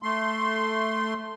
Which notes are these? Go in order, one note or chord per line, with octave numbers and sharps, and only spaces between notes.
A3 C6